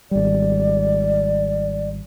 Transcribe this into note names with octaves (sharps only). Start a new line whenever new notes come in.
G#1 G3 D5